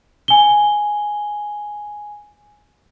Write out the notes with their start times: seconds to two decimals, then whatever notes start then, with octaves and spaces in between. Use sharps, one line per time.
0.28 G#5 G7